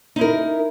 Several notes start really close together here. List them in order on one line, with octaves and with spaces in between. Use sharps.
D#4 E4 A#4